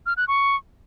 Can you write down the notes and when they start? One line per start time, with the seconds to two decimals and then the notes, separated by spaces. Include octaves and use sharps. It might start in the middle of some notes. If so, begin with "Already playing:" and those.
0.06 F6
0.17 F#6
0.28 C#6